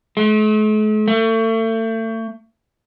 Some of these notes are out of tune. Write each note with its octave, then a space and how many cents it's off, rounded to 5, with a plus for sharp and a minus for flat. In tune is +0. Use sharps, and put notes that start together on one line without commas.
A3 -45
A3 +35